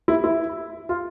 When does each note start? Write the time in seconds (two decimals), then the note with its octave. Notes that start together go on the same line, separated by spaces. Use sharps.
0.08 E4
0.24 E4
0.89 F4